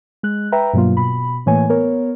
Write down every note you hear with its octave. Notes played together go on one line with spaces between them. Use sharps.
G#3 F#6
B4 E5 G5 A#5
G2 B2 F#3 A#3 F4
B2 B5
A2 E3 A3 A#3 C#5 G#5
B3 A#4 C#5